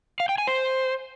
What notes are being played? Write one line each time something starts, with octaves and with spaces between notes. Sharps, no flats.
F5
G5
G#5
C5